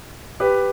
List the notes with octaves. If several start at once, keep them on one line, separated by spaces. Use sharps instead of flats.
G4 B4